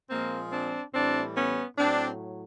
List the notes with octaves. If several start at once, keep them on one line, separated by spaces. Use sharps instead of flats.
A#2 F3 G#3 A#3 C4
C4 D4
A2 E3 G3 C4 D4
B3 C#4
A2 F#3 C4 D4